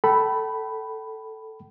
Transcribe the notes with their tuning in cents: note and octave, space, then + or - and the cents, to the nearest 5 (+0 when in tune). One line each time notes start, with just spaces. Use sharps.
A4 +0 G5 -35 B5 +0